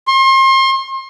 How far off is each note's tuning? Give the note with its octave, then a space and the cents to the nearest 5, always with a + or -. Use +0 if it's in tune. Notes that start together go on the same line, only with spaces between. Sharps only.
C6 +35